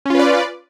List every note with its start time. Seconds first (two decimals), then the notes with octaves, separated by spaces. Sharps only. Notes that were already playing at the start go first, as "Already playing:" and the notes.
0.06 C#4
0.10 F4
0.15 B4
0.19 D5